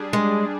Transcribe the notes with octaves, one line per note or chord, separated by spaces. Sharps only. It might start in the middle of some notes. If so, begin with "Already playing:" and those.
Already playing: G3 D4 G#4
G#3